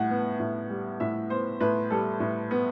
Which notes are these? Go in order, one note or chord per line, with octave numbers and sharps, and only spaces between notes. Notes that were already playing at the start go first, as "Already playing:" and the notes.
Already playing: A2 G3 F#5
B3
A2
G3
A2 E5
B3 C5
A2 B4
G3 A4
A2
B3